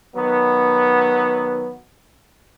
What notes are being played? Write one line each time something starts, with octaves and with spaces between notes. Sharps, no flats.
D#3 F#3 B3